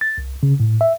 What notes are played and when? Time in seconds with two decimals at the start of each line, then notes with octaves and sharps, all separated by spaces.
0.01 A6
0.18 C2
0.43 C#3
0.60 A2
0.81 E5